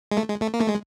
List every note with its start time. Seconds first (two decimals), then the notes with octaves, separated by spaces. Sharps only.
0.12 G#3
0.17 A3
0.29 G#3
0.42 A3
0.54 A#3
0.61 A3
0.68 G#3